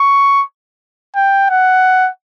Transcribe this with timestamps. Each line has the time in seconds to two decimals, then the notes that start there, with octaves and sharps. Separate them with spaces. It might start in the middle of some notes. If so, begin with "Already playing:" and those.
Already playing: C#6
1.16 G5
1.50 F#5